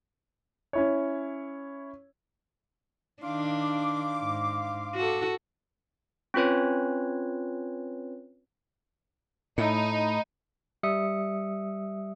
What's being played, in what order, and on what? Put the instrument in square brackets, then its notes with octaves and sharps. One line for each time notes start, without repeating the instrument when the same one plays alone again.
[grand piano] C#4 E4 C#5
[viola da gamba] D#3 D4 [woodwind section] F5 C6 D6
[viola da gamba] G#2
F#4 A4
[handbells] C4 C#4 F4 B4 C#5
[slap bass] A2 [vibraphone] A3 B5 [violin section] D#4
[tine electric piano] G3 E5 D#6 C#7